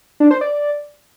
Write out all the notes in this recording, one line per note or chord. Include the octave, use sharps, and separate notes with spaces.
D4
C5
D5